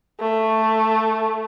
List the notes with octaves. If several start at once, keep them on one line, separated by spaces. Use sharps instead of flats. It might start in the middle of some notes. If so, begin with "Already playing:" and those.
A3